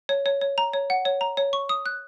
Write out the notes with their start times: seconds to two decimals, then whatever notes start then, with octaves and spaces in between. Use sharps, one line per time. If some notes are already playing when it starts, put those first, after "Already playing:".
0.09 C#5
0.26 C#5
0.41 C#5
0.58 A#5
0.74 C#5
0.90 F#5
1.05 C#5
1.21 A#5
1.37 C#5
1.53 C#6
1.69 D#6
1.86 F#6